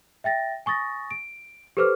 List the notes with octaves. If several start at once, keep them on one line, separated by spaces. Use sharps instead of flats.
E5 G5 A6 A#6
G#5 C#6 D#6 A6 A#6
D7
G4 A4 B4 C5 D6 F6